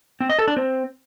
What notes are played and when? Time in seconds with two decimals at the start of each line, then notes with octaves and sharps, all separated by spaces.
0.20 C4
0.29 D#5
0.39 A4
0.48 D4
0.57 C4